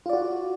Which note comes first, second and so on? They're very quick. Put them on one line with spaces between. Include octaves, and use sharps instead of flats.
F4 D5 F#4